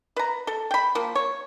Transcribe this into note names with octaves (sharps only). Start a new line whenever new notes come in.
B4 A#5
A4
G5 B5
F3 A#3
C#5